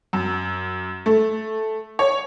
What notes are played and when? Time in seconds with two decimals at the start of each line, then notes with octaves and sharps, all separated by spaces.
0.13 F#2
1.06 A3
1.99 C#5